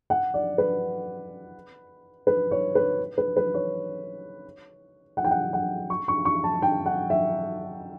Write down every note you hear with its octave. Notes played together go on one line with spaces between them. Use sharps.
F#5
D5
B4
B4
C#5
B4
B4
B4
C#5
F#5
G5
F#5
F#5
C#6
C#6
C#6
A5
G5
F#5
E5